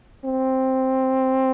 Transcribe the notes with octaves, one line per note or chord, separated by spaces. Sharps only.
C4